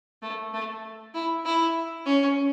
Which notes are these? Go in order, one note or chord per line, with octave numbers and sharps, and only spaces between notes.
A3
A3
E4
E4
C#4